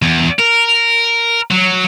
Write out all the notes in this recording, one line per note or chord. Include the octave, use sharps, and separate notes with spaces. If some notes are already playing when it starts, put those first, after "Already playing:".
E2
A#4
F#3